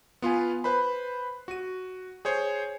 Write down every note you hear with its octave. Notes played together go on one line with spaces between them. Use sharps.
B3 F4 B4 G#5
B4 C5 B5
F#4 D#7
G#4 C5 C#5